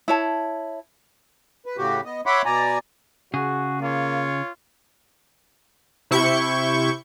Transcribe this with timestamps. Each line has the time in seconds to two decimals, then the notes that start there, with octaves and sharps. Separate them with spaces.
0.08 E4 C#5 A5
1.66 B4
1.77 A2 C#3 F#4 G4
2.05 B3 D#5
2.26 C#5 E5 F#5 B5 C6 D6
2.45 B2 D5 G#5 A#5
3.34 C#3 F#4 G#4
3.81 A#3 F4 C#5
6.11 C3 E4 C#6 G6